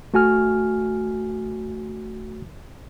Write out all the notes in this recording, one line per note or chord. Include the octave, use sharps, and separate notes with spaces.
A3 F#4 G#5 F6